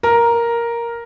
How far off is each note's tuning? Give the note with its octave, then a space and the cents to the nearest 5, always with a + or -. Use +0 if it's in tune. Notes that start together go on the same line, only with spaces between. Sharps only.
A#4 +5